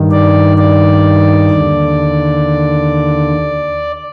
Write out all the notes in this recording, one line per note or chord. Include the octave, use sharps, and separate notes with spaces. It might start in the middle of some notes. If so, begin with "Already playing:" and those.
Already playing: G2 D#3
D5
D5
D#2 D3